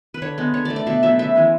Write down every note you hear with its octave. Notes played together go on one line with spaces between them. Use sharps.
B4
D3 C#5
G#3 B3
D3 C#5
A3 D5
D5
B2 E5
F#3 B3 E5
C#3 E5
E3 G#3